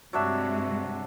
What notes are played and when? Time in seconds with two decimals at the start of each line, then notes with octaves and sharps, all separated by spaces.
0.13 G2 C3 F#3 G#3 D4 E5